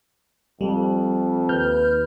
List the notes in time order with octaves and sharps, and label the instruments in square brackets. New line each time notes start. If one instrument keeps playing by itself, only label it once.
[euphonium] F2 [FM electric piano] G3
[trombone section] D#2 B4 [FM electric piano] F6 G6